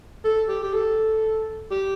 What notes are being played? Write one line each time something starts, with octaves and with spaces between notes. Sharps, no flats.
A4
G4
G4
A4
G4